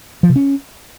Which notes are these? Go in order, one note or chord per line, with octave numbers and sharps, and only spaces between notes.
F3
C3
C#4